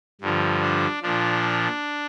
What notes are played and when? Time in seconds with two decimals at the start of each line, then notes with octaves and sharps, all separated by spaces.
0.21 G2 D3 F3
0.62 D4
1.02 A#2 F3 D4